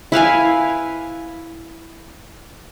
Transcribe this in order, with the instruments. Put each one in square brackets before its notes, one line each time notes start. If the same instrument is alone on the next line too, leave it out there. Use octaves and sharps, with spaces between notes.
[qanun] E4 B4 F5 G#5